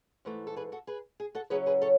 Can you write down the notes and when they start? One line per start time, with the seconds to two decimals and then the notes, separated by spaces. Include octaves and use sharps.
0.25 G#2 E3 A3
0.47 A4
0.56 G#4 B4
0.72 F#4 A4
0.87 G#4 B4
1.20 G#4
1.35 F#4 A4
1.50 C#3 F#3 C#4 E4 G#4 B4
1.66 G#4 B4
1.82 A4 C#5